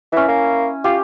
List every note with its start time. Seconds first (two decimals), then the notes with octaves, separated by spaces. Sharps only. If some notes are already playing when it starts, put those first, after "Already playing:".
0.12 E3 C#4 E4
0.28 A#3
0.84 F4 G4